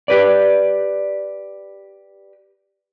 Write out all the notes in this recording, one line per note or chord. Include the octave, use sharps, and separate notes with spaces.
G4 B4 D5